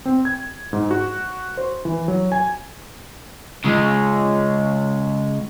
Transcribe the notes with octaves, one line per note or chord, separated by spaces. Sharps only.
C4
G#6
G#2
F#4
C5
E3
F#3
G#5
C#3 G#3